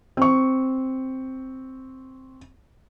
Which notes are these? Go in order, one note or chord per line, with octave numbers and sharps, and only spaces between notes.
C4 C#6